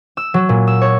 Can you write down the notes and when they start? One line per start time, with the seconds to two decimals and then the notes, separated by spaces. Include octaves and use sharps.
0.17 E6
0.34 F#3
0.49 A#2
0.67 E6
0.81 C#5